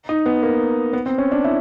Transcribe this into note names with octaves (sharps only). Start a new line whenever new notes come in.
D#4
B3
A#3
B3
C4
C#4
D4
E4